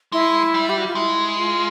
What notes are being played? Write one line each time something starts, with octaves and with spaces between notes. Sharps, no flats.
G#3 E4
G3
G4
F#4
F4
G#3 E4
F4